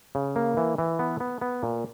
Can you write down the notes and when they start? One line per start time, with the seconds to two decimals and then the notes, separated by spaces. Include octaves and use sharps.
0.15 C#3
0.36 A#3
0.57 E3
0.78 E3
0.99 B3
1.20 B3
1.41 B3
1.63 A#2